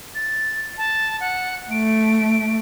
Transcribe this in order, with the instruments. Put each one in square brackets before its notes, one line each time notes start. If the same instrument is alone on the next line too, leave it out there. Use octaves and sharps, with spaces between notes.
[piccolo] A6
A5
F#5
[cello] A3 [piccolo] D7